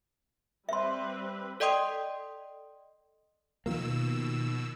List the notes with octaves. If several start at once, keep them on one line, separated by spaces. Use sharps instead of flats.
G3 C4 B4 E5 C6
A4 D5 D#5 G5 C6 D#6
B2 D#3 F3 A#3 E6